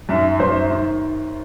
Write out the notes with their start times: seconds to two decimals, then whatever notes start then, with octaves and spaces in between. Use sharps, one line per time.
0.09 F#2 D#3 E5
0.40 F#2 D#3 C5
0.70 D#3